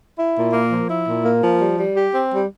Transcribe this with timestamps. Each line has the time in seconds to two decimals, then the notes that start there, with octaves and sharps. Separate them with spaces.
0.18 E4
0.36 A#2
0.53 A#3
0.71 F3
0.89 E4
1.06 A#2
1.25 A#3
1.42 F3
1.60 G3
1.78 G3
1.96 G4
2.13 C4
2.32 G3